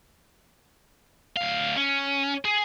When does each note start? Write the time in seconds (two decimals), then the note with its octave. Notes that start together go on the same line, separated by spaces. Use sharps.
1.37 D2 F5
1.77 C#4
2.45 G#4